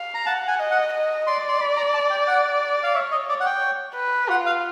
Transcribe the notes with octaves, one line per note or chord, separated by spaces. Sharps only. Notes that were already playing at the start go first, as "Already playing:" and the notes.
Already playing: F5
A#5
F#5 A5
G#5
D#5
F#5
D#5
D5 C6
C6
B5
A#5
A5
G5
F#5
F5
C#5 E5
D#5
C#5 D5
F#5
G5
B4
F4 F#5
F5